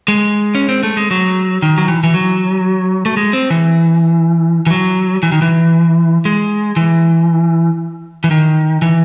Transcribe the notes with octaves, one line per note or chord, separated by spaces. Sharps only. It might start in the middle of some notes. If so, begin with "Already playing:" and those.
G#3
C#4
C4
A3
G#3
F#3
D#3
F#3
E3
E3
F#3
A3
G#3
C4
E3
E3
F#3
E3
D#3
E3
G#3
E3
E3
D#3
E3